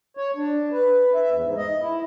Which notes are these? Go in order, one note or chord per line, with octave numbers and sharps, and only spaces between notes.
C#5
D4
B4
E5
E2
G#2
D#5
E4